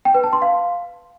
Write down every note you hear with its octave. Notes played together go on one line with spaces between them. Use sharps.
G5
B4
A5
C6
F5